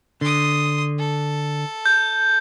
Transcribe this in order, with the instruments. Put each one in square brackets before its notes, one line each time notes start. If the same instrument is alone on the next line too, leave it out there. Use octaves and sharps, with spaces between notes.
[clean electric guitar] D3 [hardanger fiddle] C6 D#6
[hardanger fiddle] A4
[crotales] G6